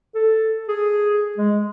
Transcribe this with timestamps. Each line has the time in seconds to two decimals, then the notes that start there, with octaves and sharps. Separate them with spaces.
0.15 A4
0.68 G#4
1.37 G#3